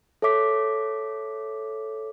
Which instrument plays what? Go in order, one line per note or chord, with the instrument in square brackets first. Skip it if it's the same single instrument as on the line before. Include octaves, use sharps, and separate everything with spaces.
[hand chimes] A4 C#5 E5 D6 B6